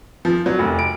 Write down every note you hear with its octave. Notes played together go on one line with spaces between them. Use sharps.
F3
F#3
F1
D7